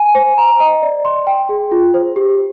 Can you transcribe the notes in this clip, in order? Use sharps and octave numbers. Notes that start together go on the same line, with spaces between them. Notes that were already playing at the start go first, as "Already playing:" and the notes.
Already playing: G#5
C5
A#5
D#5
D5
C6
G5
G#4
F4
C5
G4